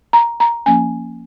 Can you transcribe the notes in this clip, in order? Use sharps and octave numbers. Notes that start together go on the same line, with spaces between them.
A#5
A#5
F3 A#3 C#4 G#5